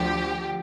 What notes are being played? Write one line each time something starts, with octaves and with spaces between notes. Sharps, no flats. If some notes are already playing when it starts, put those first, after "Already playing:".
Already playing: D2 D3 F3 G4